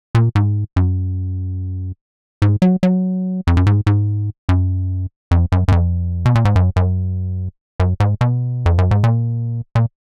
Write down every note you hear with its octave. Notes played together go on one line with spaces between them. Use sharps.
A#2
G#2
F#2
G#2
F#3
F#3
F2
F#2
G#2
G#2
F#2
F2
F#2
F#2
F2
B2
A#2
G#2
F#2
F#2
F#2
G#2
B2
F2
F#2
G#2
A#2
A#2